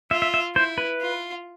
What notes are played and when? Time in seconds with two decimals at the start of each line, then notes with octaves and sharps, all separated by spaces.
0.11 F4 E5
0.22 E5
0.34 E5
0.56 E4 C5
0.78 B4
1.01 F4